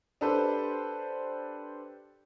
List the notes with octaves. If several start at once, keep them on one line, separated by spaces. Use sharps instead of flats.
D4 G4 A4 B4 C5